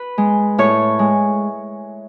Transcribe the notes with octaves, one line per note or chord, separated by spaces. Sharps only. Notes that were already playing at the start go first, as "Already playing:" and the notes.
Already playing: B4
G#3
A2 C#5
G#3